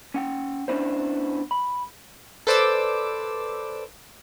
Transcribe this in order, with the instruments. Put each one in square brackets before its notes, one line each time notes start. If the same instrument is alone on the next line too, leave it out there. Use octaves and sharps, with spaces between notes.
[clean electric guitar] C#4 F#5 G5
B3 C#4 D4 E4 C5
B5
[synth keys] A4 B4 C5 D5 D6 E6